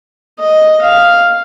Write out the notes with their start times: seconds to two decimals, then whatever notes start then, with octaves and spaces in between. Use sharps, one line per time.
0.39 D#5
0.81 F5